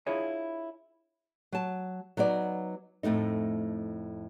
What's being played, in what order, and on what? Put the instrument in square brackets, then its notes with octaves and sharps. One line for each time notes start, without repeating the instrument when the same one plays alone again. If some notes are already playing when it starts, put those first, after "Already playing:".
[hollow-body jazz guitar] D4 E4 F4 G#4 C#5 D#5
[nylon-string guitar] F#3 A5
F#3 B3 D#4 D5
F2 A2 A3 D#4